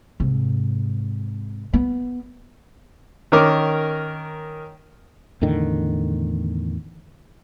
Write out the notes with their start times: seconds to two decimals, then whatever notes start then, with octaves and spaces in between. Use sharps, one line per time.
0.20 G#2 C3
1.73 B3
3.32 D#3 C#4 A#4 D6
5.42 E2 A2 D3 D#3